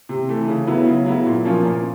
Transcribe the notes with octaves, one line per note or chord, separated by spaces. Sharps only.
C3
E3 A3
C#3
F#3 B3 E4
C#3
F#3 B3 E4
A#2
F3 A#3 C#4 F4
A#2